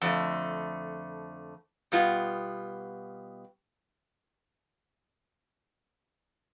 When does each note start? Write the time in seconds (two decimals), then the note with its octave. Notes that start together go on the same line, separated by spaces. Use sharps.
0.01 F2 D3 A3
1.92 B2 G3 B3 F4